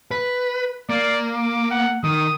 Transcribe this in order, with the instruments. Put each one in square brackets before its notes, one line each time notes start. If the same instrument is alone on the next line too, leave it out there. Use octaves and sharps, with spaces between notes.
[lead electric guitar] B4
[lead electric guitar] A#3 [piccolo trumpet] D5
[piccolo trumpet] D6
F#5
[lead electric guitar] D#3 [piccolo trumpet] D#6